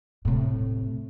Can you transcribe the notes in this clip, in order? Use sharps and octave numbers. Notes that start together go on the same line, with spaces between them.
A2 C3